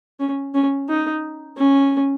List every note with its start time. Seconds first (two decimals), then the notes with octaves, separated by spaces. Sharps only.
0.20 C#4
0.54 C#4
0.89 D#4
1.58 C#4